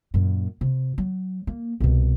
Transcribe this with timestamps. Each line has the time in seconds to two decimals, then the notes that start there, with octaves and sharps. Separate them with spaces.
0.14 F#2 A#2
0.61 C3
0.98 F#3
1.47 A#3
1.80 C2 B2